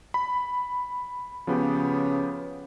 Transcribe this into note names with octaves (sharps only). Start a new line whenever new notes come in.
B5
C#3 F3 B3 G4